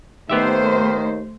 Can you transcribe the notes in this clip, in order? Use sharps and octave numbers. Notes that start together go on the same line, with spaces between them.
D#2 D#3 A3 B3 G4 C5 E5